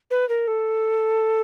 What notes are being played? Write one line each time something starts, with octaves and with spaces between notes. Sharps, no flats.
B4
A#4
A4